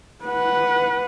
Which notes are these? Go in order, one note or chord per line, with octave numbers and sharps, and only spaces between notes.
B4 F#5